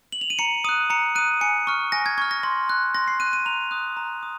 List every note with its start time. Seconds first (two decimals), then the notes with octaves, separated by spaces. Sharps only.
0.12 F#7
0.21 F7
0.30 D#7
0.39 A#5 C#7
0.64 D#6 F#6 D#7
0.90 A#5 C#7
1.15 D#6 F#6 D#7
1.41 G#5 C#7
1.67 C#6 F6
1.92 G#5 A#6
2.06 G#6
2.18 C#6 F6 G#6
2.31 A#6
2.43 C6 A#6
2.69 F#6
2.95 C6 A#6
3.08 C7
3.20 F#6 D#7
3.33 D#7
3.45 A#5 F7
3.71 D#6 F#6
3.97 A#5
4.23 D#6